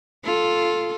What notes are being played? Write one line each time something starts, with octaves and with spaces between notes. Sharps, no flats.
F4 A4